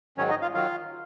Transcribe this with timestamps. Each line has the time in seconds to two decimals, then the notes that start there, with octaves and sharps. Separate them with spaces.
0.17 G#2 D#3 F#3 C#4 C#5
0.30 D#4 D#5
0.42 F4 F5
0.54 D#3 F#3 F4 F5